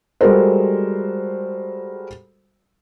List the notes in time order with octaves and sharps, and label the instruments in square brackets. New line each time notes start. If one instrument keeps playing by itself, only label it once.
[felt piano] G3 G#3 F#4 A4 A#4 C5